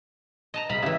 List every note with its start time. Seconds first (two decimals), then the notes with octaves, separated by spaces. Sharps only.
0.54 D#5 A5 A#5
0.69 C2 G#3 A#5 B5
0.82 C#3 E3 G4 E5